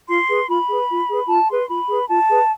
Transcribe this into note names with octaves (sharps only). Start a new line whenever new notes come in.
F4 C6
G#4 B4
F4 B5
G#4 B4
F4
G#4 B4
F4 A5
G#4 B4 C6
F4 B5
G#4 B4
F4 A5
G#4 B4